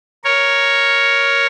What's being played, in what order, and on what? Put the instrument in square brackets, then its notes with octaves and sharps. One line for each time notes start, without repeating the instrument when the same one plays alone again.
[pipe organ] A#4 C#5